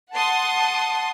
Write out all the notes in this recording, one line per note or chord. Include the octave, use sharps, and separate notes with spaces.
F#5 A5 C6 D#6